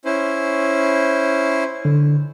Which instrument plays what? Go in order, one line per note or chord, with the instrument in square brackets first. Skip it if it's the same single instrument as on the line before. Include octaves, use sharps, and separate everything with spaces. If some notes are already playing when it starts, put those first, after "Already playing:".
[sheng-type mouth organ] C#4 E4 C5
[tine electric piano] D3